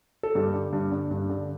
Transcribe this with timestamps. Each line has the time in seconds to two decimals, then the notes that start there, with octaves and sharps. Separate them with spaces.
0.23 A4
0.35 G2 G4
0.54 D3
0.73 G2
0.92 D3
1.11 G2
1.30 D3